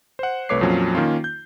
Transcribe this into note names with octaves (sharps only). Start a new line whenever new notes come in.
C5 F#5
C2 A3 B4 C#5 D6 C7
F2 A#2 F3 F#3 C#4
D#3 A#3 C#4 F4
G6